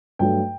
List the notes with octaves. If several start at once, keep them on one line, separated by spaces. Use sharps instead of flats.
G2 F#3 A3 G5